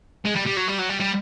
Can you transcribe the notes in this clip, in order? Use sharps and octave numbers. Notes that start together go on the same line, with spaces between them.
G#3
G3
G3
F#3
G3
F#3
G3
G3